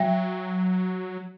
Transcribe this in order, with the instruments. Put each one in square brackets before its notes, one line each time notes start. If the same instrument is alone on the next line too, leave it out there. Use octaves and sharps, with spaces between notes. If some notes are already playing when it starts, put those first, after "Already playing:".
Already playing: [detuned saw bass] F#3 [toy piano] E5 G5